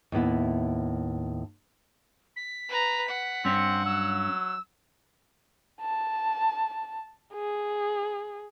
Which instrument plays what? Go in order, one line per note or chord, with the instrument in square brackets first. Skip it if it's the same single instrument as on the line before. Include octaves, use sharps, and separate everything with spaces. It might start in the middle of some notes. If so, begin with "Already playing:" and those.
[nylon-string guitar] D#2 A2 B3 E4
[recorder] B6
[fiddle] B4 A#5
F#5
[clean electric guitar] G2 C#4 [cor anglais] C4
[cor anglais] F#3 [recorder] E6
[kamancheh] A5
G#4